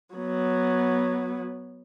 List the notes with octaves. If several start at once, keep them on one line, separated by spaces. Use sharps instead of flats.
F#3 B3